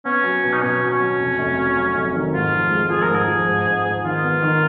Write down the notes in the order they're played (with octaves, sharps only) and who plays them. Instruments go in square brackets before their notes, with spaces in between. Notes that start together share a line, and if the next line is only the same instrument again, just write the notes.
[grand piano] B3 [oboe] C#4
[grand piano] F#3
B2
[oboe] D#4
[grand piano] B2 [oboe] C#4
[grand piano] F#3
[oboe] C#4
[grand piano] F#3
F1
F1
F#3
F#3
F1
D#3
[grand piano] G#2 [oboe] F4
[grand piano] F3
G#3
[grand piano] F3 [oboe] G#4
[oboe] A#4
[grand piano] G#2
[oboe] G#4
[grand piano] F3
G#2
G#2
G#2
[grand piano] D#3 [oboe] F4
[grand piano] B3
D#3